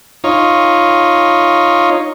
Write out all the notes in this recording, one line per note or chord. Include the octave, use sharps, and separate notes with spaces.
D#4 F4 C#5